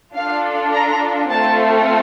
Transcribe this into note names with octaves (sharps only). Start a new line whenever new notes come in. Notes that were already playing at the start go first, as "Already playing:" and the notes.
D4 F4 A4 F5
A#5
A3 C4 F4 A4 A5